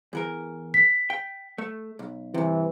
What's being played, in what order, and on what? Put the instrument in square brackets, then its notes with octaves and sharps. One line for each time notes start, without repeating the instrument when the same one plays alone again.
[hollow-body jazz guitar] E2 E3 A#4
[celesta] B6
[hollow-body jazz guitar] G5
A3
B1
[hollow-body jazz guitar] G2 C3 [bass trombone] E3